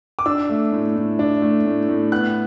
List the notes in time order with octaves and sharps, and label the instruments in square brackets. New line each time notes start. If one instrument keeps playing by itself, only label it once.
[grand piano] D6
D4 E6
A3
A2
A2
D4
A3
A2
A2
B3 F#6